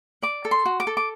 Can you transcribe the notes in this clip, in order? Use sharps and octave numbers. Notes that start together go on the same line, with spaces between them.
D5 D6
A4
C6
F#4
D6
A4
D6